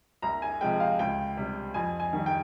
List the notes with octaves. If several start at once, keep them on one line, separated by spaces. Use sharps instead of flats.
C2 A#5
G#5
C3 F3 G#3 G5
F5
C#2 G5
C3 G3
F2 G#5
G#5
D#3 G3
G5